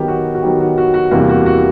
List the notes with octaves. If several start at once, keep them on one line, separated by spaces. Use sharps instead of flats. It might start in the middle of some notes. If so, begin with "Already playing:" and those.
Already playing: D#3 F#3 B3 D#4 G4
F#4
F#4
D#3 F#3 B3 D#4 G4
F#4
F#4
F#4
E2 C3 E3 G3 A#3 F#4
F#4
F#4